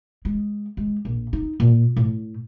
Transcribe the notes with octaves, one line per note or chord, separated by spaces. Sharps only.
G#3
G#3
A#1
D#4
A#2
A2